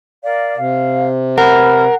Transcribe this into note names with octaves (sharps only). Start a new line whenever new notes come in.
A#4 D5 F5
C3 F5
A#4 B4 F#5 B5 F6